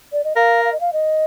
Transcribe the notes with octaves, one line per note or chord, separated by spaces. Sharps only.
D5
D#5
A#4 F5
F5
D#5
F5
D#5